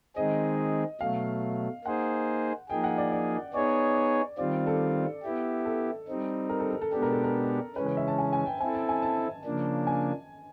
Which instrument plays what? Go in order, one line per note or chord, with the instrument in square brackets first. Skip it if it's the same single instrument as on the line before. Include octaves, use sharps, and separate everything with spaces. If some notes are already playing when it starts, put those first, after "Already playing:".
[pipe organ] D#3 G#3 C4 D#4 G#4 [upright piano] D#5
[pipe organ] B2 F#3 A3 [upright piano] F5
[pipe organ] A#3 D#4 G#4 C5 [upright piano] F#5
[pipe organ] F3 A#3 D#4 G#4 [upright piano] G5
[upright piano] F#5
D5
D5
[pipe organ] B3 D#4 G#4 C#5 [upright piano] D5
[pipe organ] D#3 G3 C4 F4 [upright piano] D5
[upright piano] A4
[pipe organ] B3 E4 G4
[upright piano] A4
[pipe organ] G3 C4 D#4
[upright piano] A#4
A4
A4
A4
[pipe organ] B2 G#3 B3 D4 G4 [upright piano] A4
[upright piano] A#4
A4
A#4
[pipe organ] C#3 E3 G#3 C#4 [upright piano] B4
[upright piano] B4
E5
A5
G#5
G#5
G5
[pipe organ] C4 E4 A4 [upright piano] G#5
[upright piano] A5
G#5
A5
[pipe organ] C#3 F3 A#3 D4
[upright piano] G#5